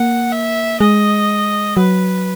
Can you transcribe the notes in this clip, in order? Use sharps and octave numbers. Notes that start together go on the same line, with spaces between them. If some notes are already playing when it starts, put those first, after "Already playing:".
Already playing: A#3 F#5
E5
G#3 D#5
F#3 B4